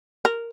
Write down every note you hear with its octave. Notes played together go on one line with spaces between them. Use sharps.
A#4